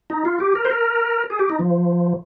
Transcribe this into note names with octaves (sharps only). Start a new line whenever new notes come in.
D#4
F4
G4
A#4
C5
A#4
G#4
G4
D#4
F3